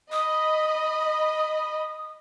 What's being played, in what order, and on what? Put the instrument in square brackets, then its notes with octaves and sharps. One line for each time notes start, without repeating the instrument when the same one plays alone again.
[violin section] D#5 B5 [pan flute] D#6